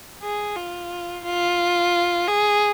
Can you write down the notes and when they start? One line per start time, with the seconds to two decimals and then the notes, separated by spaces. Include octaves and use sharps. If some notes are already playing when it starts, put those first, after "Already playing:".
0.22 G#4
0.56 F4
1.24 F4
2.27 G#4